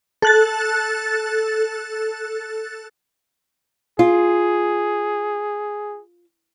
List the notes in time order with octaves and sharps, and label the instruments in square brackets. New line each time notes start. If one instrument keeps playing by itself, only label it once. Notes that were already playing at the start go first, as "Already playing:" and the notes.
[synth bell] A4 F#6 A6
[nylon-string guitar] F4 [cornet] G#4